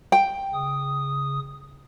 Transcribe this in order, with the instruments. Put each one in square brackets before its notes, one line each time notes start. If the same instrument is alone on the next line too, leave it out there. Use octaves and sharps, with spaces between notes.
[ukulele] G5
[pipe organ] C#3 D#6